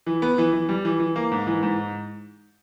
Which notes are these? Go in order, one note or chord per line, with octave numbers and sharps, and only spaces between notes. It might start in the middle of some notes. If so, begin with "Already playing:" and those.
E3
B3
E3
E3
G3
E3
E3
A#3
G#2
E3
G#2